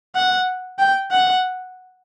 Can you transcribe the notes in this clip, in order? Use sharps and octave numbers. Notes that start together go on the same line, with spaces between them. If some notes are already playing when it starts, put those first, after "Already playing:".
F#5
G5
F#5